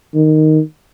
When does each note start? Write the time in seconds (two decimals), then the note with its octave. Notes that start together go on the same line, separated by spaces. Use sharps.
0.14 D#3